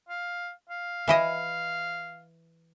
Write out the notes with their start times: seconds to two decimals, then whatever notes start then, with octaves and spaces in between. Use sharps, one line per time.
0.09 F5
0.70 F5
1.08 E3 E4 D#5